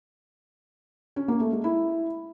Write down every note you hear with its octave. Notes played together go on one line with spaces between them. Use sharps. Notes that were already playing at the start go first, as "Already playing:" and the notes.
C#4
A#3
A3
G#3
E4